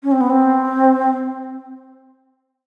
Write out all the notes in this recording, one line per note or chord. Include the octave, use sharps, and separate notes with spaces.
C#4
C4
B3
C4